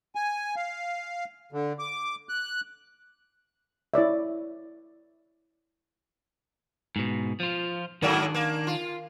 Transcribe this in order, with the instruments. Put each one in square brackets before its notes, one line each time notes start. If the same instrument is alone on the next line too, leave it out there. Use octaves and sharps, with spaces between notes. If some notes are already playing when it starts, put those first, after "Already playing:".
[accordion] G#5
F5
D3
D6
F#6
[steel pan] E4 C#5 D5 E5
[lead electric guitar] G#2 B2
F3 F4
[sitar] G#2 F#3 A#3 [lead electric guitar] D#3 D4
[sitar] A#3
F4